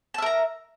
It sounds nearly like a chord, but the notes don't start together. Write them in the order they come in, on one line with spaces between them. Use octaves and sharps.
A5 E5 A#4 A#5